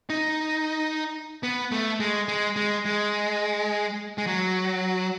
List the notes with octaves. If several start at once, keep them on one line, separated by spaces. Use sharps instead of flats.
D#4
B3
A3
G#3
G#3
G#3
G#3
G#3
F#3